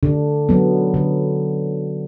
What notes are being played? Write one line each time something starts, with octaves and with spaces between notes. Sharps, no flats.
D3 D4
F#3 B3
D3